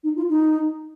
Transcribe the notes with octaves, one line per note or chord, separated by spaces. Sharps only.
D#4
F4
D#4